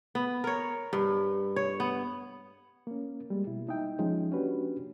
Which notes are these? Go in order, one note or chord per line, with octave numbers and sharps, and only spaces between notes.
B3
A#4 C#5
G2
C#5
B3
A#3 C#4
G3 G#3 A#3
B2 E4
A#3 D#4 D#5 E5 G5
F3 G#3 C#4 D#4
A#3 C#4 D4 F#4 G4 B4